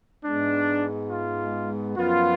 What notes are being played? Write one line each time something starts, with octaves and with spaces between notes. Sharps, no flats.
G#2 G#3 B3 D4
F4
F#2 F3 B3 F4